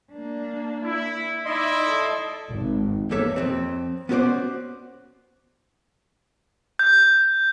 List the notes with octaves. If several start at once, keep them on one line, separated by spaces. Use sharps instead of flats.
A#3 D4
E4
D#4 E4 D5 D#5 C6
A4
G#1
E2 A#3 G4 A4 C#5 E5
F2 G#2 C4
B3 C#4 F#4 G#4 C5 D5
G6